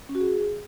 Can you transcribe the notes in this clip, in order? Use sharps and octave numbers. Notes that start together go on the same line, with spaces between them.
C#4
F#4
G#4